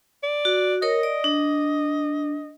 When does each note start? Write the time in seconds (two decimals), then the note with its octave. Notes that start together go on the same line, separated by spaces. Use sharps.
0.23 D5
0.45 F#4
0.82 A#4 C#5 D#5
1.03 D5
1.24 D4